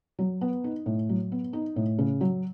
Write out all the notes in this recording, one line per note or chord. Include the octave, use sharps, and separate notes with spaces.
F#3
B3
D#4
A2
F#3
B3
D#4
A2
C#3
F#3